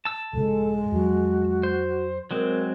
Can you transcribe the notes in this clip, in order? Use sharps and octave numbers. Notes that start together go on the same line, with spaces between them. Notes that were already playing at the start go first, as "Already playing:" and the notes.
A5 E6
A#1 G2 C#3 G#3 A4
F2 F#3 F#4
C5
F#3 G#3 C4 A#4